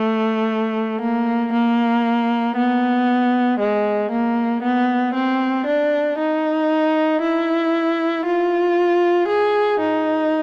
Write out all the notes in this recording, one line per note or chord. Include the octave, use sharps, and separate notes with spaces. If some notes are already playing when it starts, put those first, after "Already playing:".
Already playing: A3
A#3
A#3
B3
G#3
A#3
B3
C4
D4
D#4
E4
F4
G#4
D#4